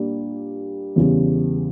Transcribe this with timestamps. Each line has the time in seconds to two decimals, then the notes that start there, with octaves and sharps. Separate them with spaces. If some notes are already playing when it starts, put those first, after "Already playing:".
Already playing: A#2 G3 A#3 D4
0.96 E2 C#3 G3